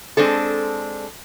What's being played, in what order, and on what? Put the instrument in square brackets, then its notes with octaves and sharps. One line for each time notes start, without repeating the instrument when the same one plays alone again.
[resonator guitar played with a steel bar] G#3 C4 D4 A4